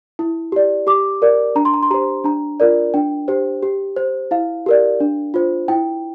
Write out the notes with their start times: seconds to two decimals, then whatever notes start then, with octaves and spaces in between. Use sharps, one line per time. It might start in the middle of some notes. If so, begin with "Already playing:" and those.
0.19 E4
0.52 G4 D5
0.87 G4 D6
1.22 A#4 D5
1.55 D4 A#5
1.65 C6
1.74 A#5
1.83 C6
1.91 G4 C5 A#5
2.24 D4 A#5
2.60 F4 A#4 D5
2.94 D4 G5
3.28 G4 C5
3.63 G4
3.96 C5
4.31 E4 F5
4.66 G4 A#4 D5
5.00 D4
5.34 F4 C5
5.68 E4 G5